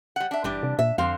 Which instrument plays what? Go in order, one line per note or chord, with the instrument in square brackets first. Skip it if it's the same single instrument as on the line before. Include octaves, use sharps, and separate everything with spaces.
[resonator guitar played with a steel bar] G3 F#5
D4 E5
[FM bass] F#1 [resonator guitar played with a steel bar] E3 G3 D4
[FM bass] C3
[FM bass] A#2 [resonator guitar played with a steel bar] E5
[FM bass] F2 [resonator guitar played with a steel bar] D3 C4 F5